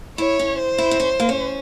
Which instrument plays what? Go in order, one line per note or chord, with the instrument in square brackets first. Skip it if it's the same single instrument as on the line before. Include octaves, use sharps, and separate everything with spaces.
[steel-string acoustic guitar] E4 [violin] C#5
[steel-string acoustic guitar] C#4
[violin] C5
[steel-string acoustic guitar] E4
C4
C#4
A#3
C#4